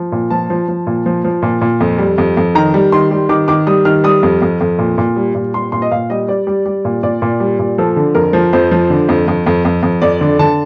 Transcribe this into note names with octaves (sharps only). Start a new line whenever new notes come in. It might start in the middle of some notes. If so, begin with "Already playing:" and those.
Already playing: F3
A#2
F3 A5
F3
F3
A#2
F3
F3
A#2
A#2
F2
G3
F2
F2
D#3 A#5
G3
D#3 C6
G3
D#3 D6
D#3 D6
G3 D#6
D#3 F6
G3 D#6
F2
F2
F2
A#2
A#2
G3
A#2
G3 C6
A#2 C6
D#5
A#2 F5
G3 D#5
G3 D5
G3
G3
A#2
A#2 D5
A#2
G3
A#2
F3 A4
D3
F2 A#4
F3
F2 C5
F3
D3
F2
F2
F2
F2
F2
F2 D5
D3
D3 A5